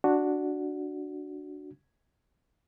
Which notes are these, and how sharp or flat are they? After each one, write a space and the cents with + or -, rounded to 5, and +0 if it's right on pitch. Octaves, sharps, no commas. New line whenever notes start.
D4 +0 F#4 +0